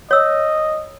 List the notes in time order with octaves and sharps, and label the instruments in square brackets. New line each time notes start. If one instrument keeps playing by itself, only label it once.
[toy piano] C#5 E6 [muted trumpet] D#5